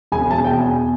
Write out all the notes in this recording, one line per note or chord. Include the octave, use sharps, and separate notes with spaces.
E1 G#5
E1 A5
G5
E2
G#5
E2